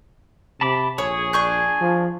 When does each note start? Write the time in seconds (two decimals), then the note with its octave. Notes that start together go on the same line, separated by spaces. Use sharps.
0.61 C3 A5 B5 D6
0.98 A#1 G#4 C#5 G#5
1.33 D4 C#6 G6
1.81 F3